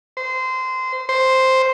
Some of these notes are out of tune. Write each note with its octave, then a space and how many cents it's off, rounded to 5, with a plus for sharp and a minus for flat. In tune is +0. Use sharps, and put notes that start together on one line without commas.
C5 -20
C5 +0